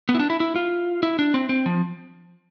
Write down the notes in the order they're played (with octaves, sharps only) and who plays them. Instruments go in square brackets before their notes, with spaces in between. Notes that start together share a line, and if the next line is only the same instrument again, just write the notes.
[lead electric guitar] B3
E4
D4
E4
E4
F4
E4
D4
C4
C4
F3